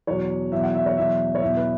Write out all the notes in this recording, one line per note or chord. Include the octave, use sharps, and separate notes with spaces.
E2 B2 F#3 C#5
E2 B2 F#3 E5
F#5
E5
C#5
E2 B2 F#3 E5
C#5
E2 B2 F#3 E5
B4